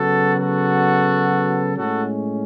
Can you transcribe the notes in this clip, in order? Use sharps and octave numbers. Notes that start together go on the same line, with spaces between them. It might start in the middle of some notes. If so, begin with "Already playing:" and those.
Already playing: C#3 F#3 B3 F#4 A4
F#4 A4
A2 G#3 C#4 F#4 A4